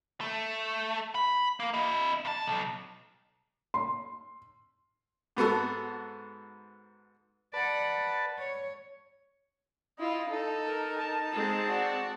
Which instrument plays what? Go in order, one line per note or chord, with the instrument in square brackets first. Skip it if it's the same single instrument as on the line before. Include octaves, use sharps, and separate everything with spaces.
[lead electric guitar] A3
B5
A#3
E4 D#5
F2 A5
B1
[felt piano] C6
[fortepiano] G#2 B3 F#4 A4
[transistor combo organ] B4 A5 [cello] D5 F#5
[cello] C#5
[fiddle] E4 F4 [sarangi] D#5
[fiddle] D#4 [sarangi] A4
[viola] A#4
[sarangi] A5
[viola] G#3 C4
[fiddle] F#4 D5